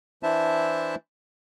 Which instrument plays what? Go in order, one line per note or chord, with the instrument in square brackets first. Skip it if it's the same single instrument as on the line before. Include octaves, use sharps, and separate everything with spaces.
[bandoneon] E3 D4 E4 C5 E5 A5